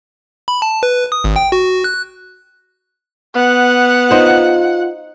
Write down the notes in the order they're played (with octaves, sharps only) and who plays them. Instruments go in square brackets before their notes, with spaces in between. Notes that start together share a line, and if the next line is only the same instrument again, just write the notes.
[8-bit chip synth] B5
A5
B4
D#6
G#1
G5
F#4
F#6
[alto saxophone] B3 [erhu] F#5
[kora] D#4 C5 [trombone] F4